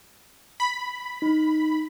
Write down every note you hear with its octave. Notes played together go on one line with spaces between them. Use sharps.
B5
D#4